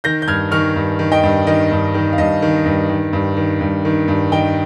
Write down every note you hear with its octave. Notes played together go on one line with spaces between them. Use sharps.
D#3 G6 A#6
G6
G2 F6 G#6
D#3 C#6 F6
G2
D#3
D#5 G5
G2
D#3 D#5
G2
D#3
F5
G2 D#5
D#3
G2
D#3
G2
D#3
G2
D#3
G2
D#3 D#5 G5